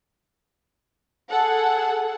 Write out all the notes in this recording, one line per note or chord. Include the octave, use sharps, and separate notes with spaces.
G#4 A4 F#5